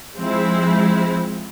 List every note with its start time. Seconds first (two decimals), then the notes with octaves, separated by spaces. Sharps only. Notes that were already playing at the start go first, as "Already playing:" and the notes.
0.16 F3 G#3 C4 E4